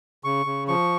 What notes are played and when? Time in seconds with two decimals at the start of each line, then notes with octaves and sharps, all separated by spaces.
0.24 C#3 C#6
0.46 C#3
0.68 F3 C#6